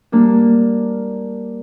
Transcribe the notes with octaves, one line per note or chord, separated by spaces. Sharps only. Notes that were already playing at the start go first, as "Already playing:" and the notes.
G3 A#3 D4